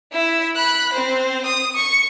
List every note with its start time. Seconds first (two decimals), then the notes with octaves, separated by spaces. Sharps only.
0.12 E4 E5
0.56 B5 F#6
0.93 C4 C5
1.45 D#6
1.76 C#6